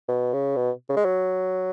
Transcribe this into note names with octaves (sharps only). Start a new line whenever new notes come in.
B2
C#3
B2
C#3
G#3
F#3